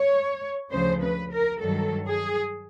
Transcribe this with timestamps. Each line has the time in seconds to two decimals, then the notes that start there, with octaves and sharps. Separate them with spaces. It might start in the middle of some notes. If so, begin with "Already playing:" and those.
Already playing: C#5
0.72 D2 C#3 F3 C5
1.02 B4
1.32 A#4
1.61 G2 D#3 F#3 A4
2.07 G#4